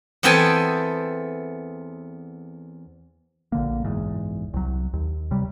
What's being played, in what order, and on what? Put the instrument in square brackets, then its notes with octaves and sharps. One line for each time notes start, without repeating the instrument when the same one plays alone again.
[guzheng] E2 B3 C4 A4 G5 G#5
[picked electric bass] A#1 D3 A#3
F#1 B1 E2 G#2
C2 F#3
D#2
C3 F#3 G3